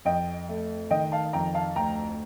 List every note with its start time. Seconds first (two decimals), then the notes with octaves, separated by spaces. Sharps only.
0.05 F2 D#5 G5
0.48 A3
0.91 D#3 D#5 G5
1.12 F5 A5
1.33 F2 G5 A#5
1.54 F5 A5
1.76 D2 G5 A#5